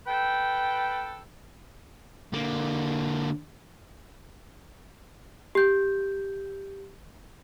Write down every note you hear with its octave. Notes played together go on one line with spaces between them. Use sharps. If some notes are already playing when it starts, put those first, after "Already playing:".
A4 B4 G5
D3 A#3
G4 G6